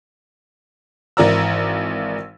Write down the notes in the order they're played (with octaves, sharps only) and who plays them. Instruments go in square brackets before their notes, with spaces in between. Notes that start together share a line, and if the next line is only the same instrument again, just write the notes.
[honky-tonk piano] G#1 E3 A#4 D5 A#5 E6